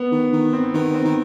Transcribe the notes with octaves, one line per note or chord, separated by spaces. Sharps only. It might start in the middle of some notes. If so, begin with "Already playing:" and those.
Already playing: B3
D#3
D#3
C4
D#3 B3
C4
D#3